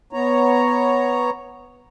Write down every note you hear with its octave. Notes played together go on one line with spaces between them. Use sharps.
B3 C#5 A#5